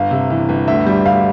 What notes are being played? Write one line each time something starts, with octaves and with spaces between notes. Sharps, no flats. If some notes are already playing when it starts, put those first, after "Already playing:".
Already playing: G1 F5
C3
E3
G1
D2 E5
G3
D2 F5